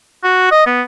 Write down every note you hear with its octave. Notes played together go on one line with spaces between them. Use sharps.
F#4
D#5
B3